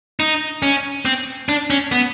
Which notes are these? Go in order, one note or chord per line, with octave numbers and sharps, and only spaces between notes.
D#4
C#4
C4
D4
C#4
B3